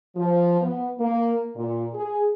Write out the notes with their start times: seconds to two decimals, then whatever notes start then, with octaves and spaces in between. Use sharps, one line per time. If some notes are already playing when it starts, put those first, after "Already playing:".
0.16 F3
0.61 B3
0.99 A#3
1.56 A#2
1.94 G#4